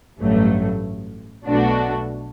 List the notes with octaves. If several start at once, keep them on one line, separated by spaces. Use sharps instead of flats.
A1 G2 F#3 A3
B1 B2 A3 D4 F#4